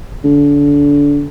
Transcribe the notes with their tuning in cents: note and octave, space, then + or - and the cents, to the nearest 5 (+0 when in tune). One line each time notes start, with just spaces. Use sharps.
D3 -30